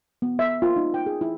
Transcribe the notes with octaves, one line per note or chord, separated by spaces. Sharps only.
B3
E5
F4
D#4
G5
G#4
E4